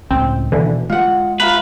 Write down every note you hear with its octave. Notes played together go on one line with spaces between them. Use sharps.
C#2 A2 G#3 C4
D#2 B2 D3 E3
G#3 F4 F#5
F4 B4 E5 A#5